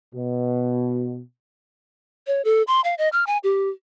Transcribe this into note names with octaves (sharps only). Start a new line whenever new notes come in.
B2
C#5
A4
C6
F5
D#5
F6
G#5
G4